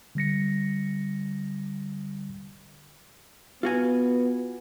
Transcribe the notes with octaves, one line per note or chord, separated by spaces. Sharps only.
D3 G3 A#6 C#7
B3 F4 F#4 G#5